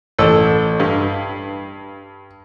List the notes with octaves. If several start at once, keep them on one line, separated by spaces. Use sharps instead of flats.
A1 A4 E6
G2